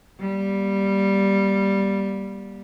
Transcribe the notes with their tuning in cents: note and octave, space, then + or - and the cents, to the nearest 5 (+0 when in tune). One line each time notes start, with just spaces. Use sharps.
G3 +0 A#3 +30